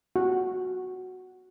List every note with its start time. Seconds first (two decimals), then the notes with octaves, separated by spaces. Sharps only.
0.16 F#4